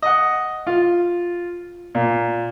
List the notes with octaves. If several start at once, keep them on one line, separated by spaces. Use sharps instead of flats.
D#5 F#5
F4
A#2